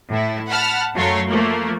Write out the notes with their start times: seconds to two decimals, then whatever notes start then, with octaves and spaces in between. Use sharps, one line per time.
0.11 A2 E4
0.51 F#5 A5 B5 F6
0.94 F#2 F#3 A3 C#5 F5 C6
1.30 F3 A3 A#3